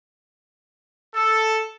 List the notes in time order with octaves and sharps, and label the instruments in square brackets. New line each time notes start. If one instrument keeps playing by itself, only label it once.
[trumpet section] A4